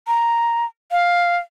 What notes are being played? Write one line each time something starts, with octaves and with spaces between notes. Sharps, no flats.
A#5
F5